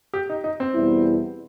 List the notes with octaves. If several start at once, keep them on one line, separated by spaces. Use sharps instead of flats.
G4
D#4
D#4
C4
E2 B2 G3 B3 E4